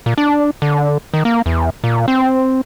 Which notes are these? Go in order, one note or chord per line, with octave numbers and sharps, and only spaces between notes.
A#2
D4
D3
D#3
A#3
E2
A#2
C4